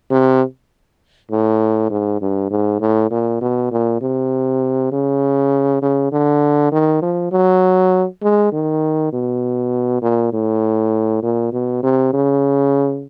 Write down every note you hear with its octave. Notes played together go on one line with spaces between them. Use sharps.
C3
A2
G#2
G2
G#2
A2
A#2
B2
A#2
C3
C#3
C#3
D3
D#3
F3
F#3
G#3
D#3
B2
A#2
A2
A#2
B2
C3
C#3